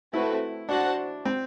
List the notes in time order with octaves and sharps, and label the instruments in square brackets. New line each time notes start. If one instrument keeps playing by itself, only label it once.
[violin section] A3 C4 F#4 B4 [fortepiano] E4
[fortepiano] D4 [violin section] F#4 C5 F#5 A5
[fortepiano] C4